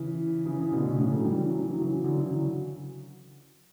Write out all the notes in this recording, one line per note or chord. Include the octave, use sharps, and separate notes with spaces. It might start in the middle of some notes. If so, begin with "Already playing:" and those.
Already playing: C#3 E3
C#3 E3
C#3
B2 D3
A2 C#3
A2 C#3
F#3 A3
E3 G3
E3
F#3
E3
F#3
C#3 E3
D3 F#3
C#3 E3
D3 F#3